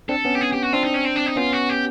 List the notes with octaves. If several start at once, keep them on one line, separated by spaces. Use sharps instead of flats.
C4 D4 A4
B3 C#4
G4
G#4
G4
F#4
C4 D4 F4
D#4
C#4
C4
D4
D#4
B3 C#4 F4
F#4
G4